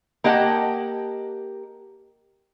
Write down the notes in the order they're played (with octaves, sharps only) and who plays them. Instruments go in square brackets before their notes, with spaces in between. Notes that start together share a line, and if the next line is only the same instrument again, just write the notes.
[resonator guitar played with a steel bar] A#3 G4 D#5 F#5 G5 A5